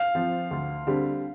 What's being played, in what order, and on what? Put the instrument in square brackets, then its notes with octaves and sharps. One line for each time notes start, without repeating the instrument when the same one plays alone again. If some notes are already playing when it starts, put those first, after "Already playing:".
Already playing: [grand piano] F5
[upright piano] F3 C4 F4
D2
D3 G3 C4